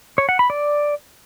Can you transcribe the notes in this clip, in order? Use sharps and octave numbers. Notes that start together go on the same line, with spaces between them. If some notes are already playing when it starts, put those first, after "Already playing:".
C#5
F#5
B5
D5